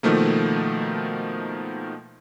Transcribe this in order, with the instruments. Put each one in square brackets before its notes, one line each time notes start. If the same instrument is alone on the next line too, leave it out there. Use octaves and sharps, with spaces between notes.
[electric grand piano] B2 D#3 F3 A3 A#3